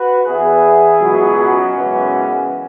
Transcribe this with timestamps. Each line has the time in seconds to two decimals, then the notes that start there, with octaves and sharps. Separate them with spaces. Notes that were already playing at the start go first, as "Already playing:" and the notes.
Already playing: F#4 B4
0.26 E2 E3 B3 E4 G#4
1.00 C#2 B2 F#3 B3
1.37 C#4 F#4
1.72 F#2 C#3 E3 G#3 B3